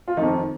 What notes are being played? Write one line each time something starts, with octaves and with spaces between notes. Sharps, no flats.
F4
F2 D#3 D#4